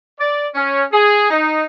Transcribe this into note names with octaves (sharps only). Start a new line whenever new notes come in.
D5
C#4
G#4
D#4